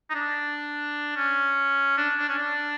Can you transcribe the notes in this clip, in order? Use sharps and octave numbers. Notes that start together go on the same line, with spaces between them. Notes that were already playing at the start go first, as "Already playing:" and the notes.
D#4
D4
C#4
D4
D4
C#4
D4